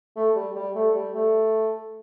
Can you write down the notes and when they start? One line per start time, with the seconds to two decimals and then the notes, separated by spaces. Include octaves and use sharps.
0.16 A3
0.36 G3
0.56 G3
0.75 A3
0.95 G3
1.15 A3